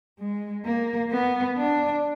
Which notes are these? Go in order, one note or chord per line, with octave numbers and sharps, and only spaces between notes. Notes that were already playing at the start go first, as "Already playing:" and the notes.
G#3
A#3
B3
D4